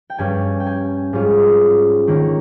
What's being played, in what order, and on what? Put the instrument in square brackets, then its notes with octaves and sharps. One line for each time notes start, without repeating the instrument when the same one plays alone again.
[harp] G5
G2 G3 C#4 G#5
G5
G#5
G#2 G3 C#4 F4
D#3 A#3 C#4